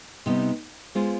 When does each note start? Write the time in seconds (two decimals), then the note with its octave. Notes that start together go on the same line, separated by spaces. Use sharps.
0.26 C3 G3 B3 D#4
0.95 G#3 B3 F4 C5